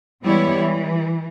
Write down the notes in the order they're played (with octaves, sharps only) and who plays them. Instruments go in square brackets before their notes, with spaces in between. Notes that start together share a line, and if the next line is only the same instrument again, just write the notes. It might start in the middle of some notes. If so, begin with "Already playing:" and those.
[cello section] E3 G3 G#3 B3 E4 C#5
E3